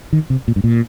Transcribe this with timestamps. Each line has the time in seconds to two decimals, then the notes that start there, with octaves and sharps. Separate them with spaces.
0.13 D#3
0.30 C3
0.48 A#2
0.56 G2
0.64 A#2